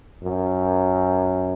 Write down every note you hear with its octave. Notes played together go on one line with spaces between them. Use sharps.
F#2